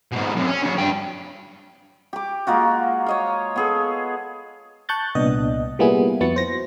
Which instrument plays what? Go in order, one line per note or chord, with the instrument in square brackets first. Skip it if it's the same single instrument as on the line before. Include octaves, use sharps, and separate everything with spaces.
[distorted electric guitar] G#2 B2
F#2 C3
C#4
C#3 F#3
G2 G5
[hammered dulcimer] G4 D6
G#3 A#3 F4 F#4
C#5 D#5 F5
B3 G#4 A4
[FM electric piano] A5 C#6 F#6 G6 A6
C2 A#2 B3 D4 D#5
G3 A#3 B3 E4 F4 G#4
F2 B3 E4 F#4 A6 C#7
C5 A#6